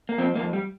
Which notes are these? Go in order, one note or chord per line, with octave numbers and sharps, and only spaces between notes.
A#3
F2 C4
F2 A#3
G3